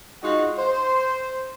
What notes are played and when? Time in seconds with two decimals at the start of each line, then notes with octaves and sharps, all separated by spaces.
0.23 G#3 D#4 F4 F#4
0.58 C5